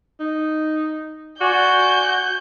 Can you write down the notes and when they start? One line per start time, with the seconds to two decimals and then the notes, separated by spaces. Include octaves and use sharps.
0.20 D#4
1.41 F#4 D5 G#5 G6